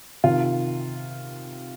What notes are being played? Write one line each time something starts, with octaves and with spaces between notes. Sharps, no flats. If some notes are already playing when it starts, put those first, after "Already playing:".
C3 D#3 F4